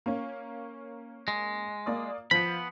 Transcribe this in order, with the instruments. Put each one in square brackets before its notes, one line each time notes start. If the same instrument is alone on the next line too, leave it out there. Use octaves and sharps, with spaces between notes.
[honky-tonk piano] A#3 C#4
[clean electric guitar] G#3
[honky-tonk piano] A#3 D5 D#6
[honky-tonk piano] F3 [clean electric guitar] B3 B5